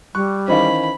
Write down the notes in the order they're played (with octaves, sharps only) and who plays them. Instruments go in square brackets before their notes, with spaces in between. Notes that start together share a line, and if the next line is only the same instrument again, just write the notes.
[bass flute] G3 [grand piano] C#6 [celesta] F#6
[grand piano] D#3 E3 C#4 [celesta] C5 D#5 F5 [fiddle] B5